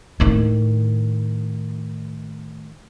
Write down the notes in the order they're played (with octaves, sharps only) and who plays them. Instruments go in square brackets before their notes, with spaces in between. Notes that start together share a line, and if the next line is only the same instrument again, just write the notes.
[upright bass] A2 D#3